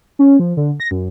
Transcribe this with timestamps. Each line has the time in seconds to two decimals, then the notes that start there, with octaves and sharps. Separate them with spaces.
0.19 C#4
0.40 F3
0.57 D3
0.80 A#6
0.91 F#2